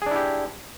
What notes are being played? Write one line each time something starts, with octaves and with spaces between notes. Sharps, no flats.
D4 E4 G4 G#4